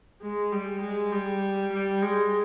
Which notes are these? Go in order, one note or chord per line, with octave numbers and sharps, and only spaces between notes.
G#3
G3
G#3
G3
G3
G#3